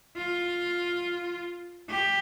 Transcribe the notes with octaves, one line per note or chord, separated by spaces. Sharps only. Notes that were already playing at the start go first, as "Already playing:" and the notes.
F4
G4